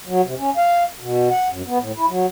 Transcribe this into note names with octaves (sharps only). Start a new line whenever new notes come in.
F#3
C3
C#4
F5
B2
F#5
F#2
B3
A2
E4
F#3